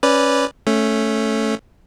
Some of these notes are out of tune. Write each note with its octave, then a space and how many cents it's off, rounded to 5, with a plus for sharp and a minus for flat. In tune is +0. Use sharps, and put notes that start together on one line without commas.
C#4 +0 B4 +0 D5 -5
A3 +0 C#4 +0